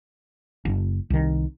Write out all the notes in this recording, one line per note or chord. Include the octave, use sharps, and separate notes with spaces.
F#1
C2 D#3